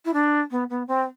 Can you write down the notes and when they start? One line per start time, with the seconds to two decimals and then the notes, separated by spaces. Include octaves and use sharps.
0.05 E4
0.13 D4
0.51 B3
0.70 B3
0.87 C4